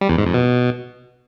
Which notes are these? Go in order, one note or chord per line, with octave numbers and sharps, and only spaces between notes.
G3
E2
G#2
F2
B2